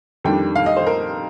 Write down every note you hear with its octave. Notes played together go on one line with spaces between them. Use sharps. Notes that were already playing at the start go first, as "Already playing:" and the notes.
F2 D#3 G3 D4 G5
F5
D#5
C5
A#4